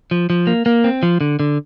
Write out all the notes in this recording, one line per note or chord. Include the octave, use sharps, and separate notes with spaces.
F3
F3
A#3
A#3
C4
F3
D3
D3